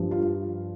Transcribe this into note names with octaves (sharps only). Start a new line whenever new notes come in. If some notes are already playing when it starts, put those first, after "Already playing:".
Already playing: G2 F3
F4